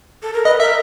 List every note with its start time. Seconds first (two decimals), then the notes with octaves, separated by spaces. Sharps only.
0.23 A4
0.33 A#4
0.45 B4 D#5
0.60 A#4 E5